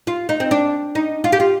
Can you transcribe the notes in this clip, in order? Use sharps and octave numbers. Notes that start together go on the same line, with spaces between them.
F4
D#4
C4
D4
D#4
F4
G4
F4